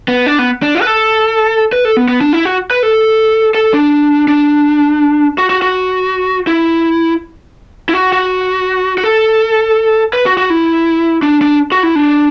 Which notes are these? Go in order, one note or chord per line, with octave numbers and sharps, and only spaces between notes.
B3
D4
B3
D4
E4
B4
A4
B4
A4
B3
B3
D4
E4
F#4
B4
A4
A4
D4
D4
F#4
F#4
F#4
E4
E4
F#4
F#4
F#4
A4
B4
F#4
F#4
E4
D4
D4
F#4
E4
D4